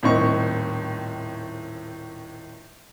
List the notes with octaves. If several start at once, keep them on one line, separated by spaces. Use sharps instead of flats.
D#1 A2 D#3 C4 D#5 C#6